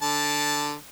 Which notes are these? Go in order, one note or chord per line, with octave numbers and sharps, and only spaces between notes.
D3 A5